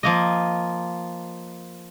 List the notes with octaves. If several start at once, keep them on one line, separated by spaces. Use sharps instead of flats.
F3 A#3 D#5